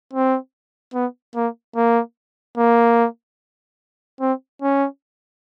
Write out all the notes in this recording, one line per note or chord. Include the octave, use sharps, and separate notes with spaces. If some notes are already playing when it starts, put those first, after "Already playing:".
C4
B3
A#3
A#3
A#3
C4
C#4